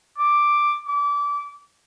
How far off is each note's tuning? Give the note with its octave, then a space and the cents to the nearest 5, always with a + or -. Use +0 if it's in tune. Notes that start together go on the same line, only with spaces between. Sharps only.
D6 +5
D6 -25